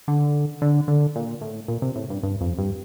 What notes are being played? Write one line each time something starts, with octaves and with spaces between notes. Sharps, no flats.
D3
D3
D3
A#2
A2
A#2
C3
A2
G2
G2
F2
G2